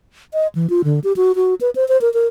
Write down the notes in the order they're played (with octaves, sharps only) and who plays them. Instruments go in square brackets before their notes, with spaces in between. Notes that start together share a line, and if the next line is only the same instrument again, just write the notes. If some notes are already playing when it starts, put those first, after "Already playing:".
[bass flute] D#5
E3
F4
D3
G4
F#4
F#4
B4
C5
C5
A#4
A#4